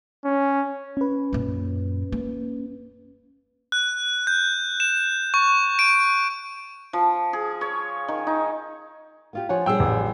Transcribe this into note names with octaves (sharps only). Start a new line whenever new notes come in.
C#4
C#4 B4
F#2 A#2
A#3
F#6
G6
E7
C#6
D7
F3
G#4
C#5
D#3
D#4
B3 F4 G4
F3 C#5 F#5 G#5
A#2 G3 G#4 G5 E6
A1